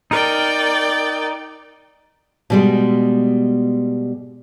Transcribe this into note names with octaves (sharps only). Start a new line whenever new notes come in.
D#4 A#4 D5 G5
B2 G3 G#3